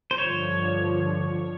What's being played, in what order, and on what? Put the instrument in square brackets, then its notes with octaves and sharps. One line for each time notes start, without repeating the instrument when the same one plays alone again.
[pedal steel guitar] C5
[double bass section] G2 D3 F3 [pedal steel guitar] C#5